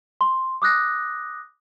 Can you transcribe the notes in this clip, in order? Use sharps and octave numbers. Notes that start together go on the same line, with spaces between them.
C6
D6 D#6 F#6 A#6